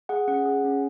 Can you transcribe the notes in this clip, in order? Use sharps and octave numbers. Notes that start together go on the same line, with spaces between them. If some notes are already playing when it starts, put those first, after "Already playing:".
G#4 F#5
C#4 F#5
G#4
C#4